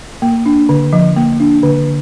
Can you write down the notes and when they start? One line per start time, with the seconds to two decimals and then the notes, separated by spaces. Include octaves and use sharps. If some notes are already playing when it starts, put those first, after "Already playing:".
0.22 A#3
0.46 D4
0.69 D3
0.93 F3
1.16 A#3
1.40 D4
1.63 D3